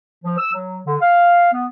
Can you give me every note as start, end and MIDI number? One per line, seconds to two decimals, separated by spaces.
0.24 0.35 53
0.37 0.49 88
0.53 0.79 54
0.85 0.95 50
1.01 1.52 77
1.52 1.66 59